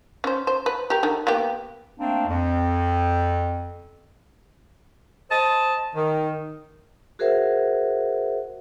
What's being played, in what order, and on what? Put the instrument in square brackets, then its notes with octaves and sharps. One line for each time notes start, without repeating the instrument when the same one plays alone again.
[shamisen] C#4 C5
C5
B4
G4 A#4
D3 D#3
A#3 B3 G4
[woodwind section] A3 A#3 C4 D4
F2
[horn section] C5 D#5 A5
D#3
[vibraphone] F#4 G#4 A#4 C5 E5 F#5